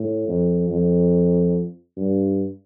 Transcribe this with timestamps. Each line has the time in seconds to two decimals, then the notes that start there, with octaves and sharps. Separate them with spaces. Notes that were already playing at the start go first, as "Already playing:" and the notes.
Already playing: A2
0.28 F2
0.70 F2
1.97 G2